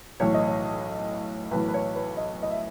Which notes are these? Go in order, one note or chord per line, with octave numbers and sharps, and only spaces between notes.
B1 A2 E3 C#5
D#5
C#5
B1 A2 E3 B4
B4
C#5
B4
D#5
D#5
E5